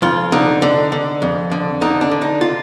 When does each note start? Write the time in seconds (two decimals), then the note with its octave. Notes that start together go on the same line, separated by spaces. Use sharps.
0.02 F2 F4
0.32 D3 D#4
0.62 D3
0.92 D3
1.22 F2
1.52 D3
1.81 D3 D#4
2.01 D4
2.11 D3
2.22 D#4
2.41 F4